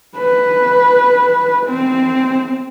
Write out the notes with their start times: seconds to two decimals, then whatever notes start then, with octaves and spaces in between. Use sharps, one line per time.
0.17 B4
1.66 C4